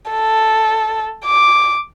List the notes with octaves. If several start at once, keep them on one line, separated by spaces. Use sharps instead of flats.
A4
D6